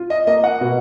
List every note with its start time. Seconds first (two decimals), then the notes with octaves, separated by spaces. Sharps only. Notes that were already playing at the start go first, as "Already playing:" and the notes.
Already playing: F4
0.10 D#5
0.27 A#3 D#5
0.44 F#5
0.61 B2